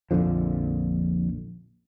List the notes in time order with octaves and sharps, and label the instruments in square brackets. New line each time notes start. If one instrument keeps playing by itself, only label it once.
[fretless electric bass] A#1 F2 D3 F3